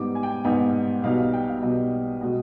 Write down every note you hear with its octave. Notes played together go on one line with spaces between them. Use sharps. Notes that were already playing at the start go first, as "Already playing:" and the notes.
Already playing: G#2 G3 B3 D#4 D6
G#5
G5
G#5
G#2 G3 B3 D#4 G5
B1 B2 G3 B3 D#4 F5
F5
G5
F5
B1 B2 G3 B3 D#4 D#5
B2 G#3 D#5